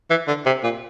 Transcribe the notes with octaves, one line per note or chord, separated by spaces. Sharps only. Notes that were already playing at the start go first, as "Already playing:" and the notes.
E3
D3
C3
A#2